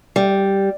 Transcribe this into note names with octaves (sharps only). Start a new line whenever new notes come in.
G3